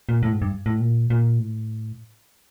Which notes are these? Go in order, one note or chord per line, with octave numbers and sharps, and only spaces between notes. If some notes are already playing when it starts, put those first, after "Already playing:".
A#2
A2
G#2
G2
A2
A#2
A#2
A2